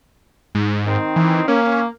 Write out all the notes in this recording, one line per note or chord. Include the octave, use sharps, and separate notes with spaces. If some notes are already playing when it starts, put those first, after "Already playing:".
G#2
D#3 C4 D#4
E3
A#3 C#4